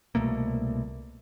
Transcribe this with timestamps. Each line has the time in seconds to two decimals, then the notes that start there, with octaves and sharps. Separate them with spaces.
0.15 C2 B2 A3 A#3